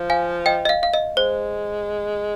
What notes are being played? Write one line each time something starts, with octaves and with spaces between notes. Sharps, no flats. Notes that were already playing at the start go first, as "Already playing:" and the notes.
Already playing: F3
F5 G#5
D#5 G5
D#5
F5
F5
D#5
G#3 C5